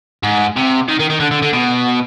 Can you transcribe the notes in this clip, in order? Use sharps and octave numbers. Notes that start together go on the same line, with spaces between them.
G#2
C3
D#3
D#3
D#3
D3
D3
D3
B2